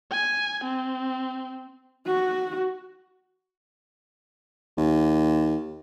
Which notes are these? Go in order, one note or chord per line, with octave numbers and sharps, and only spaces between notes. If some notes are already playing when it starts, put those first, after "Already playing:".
G#5
C4
F#4
D#2